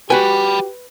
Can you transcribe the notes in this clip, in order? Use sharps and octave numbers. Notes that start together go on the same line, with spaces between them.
F#4 G4 B4 G5 G#5 B5